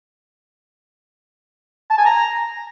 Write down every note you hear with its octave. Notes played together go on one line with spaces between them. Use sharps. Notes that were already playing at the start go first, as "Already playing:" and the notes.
A5
G#5
A#5